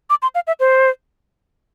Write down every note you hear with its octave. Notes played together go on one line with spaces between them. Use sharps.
D6
C6
F5
E5
C5